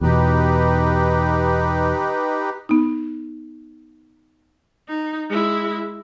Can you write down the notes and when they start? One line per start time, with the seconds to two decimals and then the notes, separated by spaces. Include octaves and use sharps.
0.01 E2 B2 D#4 G4 B4
2.69 B3 D#4
4.88 D#4
5.30 G#3 E4